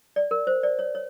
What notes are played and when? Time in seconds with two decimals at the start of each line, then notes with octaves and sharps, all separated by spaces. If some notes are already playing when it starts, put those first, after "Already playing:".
0.16 D5
0.31 A#4
0.47 C5
0.63 D5
0.79 C#5
0.95 C#5